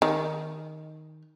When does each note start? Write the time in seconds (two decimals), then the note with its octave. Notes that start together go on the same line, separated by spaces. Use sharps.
0.02 D#3